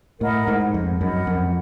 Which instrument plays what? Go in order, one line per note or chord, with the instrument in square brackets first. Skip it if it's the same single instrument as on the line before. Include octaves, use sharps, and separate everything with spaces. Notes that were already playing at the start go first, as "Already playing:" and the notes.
[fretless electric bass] A2 [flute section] A#4 D#5 F#5 B5
[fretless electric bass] G#2
F2
[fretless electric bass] F#2 [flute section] A#4 D#5 F#5 B5
[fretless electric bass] F2